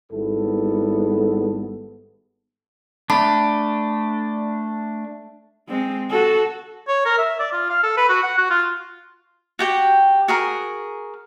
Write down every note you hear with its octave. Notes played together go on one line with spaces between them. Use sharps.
G#1 G#2 G3 B3 E4 A4
A3 D4 A5 B5
G#3 C4
F#4 A4
C#5
A#4
E5
D5
F4
F5
A4
B4
F#4
F#5
F#4
F4
F#4 G4 G5
F#4 G#4 A#4